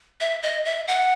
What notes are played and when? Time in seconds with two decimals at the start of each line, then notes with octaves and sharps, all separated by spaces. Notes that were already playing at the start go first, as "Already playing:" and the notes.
0.20 E5
0.43 D#5
0.65 E5
0.88 F#5